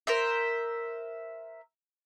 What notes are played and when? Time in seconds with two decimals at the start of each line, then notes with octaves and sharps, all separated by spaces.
0.07 A#4 C5 E5